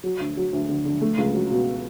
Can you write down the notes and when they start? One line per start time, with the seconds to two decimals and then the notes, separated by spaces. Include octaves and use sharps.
0.04 F#3
0.20 D2
0.37 F#3
0.53 D2
0.69 D3
0.85 D3
1.01 A3
1.18 C#2
1.34 F#3
1.51 B2